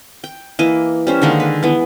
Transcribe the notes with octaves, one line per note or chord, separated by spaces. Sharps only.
G5
E3 A#3 D#5
G3 C#4 C5
D3 D#3 G#3 A#3
B4
E3 B3